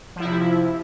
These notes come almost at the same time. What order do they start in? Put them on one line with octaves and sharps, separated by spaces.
F3 E4 C3